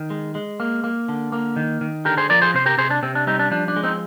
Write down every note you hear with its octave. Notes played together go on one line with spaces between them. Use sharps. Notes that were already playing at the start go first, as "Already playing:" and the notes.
Already playing: D#3
G#3
G#3
A#3
A#3
D3
A#3
D#3
D#3
D3 G4 A#4
G#4 C5
F3 A#4 D5
G#4 C5
C3 C5
G4 A#4
C3 G#4 C5
D4
C3 C4
D4
G3 C4 D#4
D4
F3 D4
D4
G#3
C4 D#4